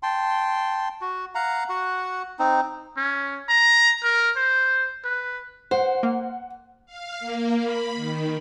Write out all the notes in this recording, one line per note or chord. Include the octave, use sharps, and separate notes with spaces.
G5 A5 C6
F#4
F5 F#5 A#5
F#4 F#5
C4 D#4
C#4
A#5
A#4
C5
B4
C5 F#5
A#3
F5
A#3
B5
D#3